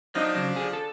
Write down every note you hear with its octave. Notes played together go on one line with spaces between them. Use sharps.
F3 F#3 D4 D#4 D#5
C#3 F#3
D3 G#4
A4